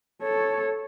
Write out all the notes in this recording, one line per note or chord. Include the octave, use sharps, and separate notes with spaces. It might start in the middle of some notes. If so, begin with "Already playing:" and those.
A4 C#5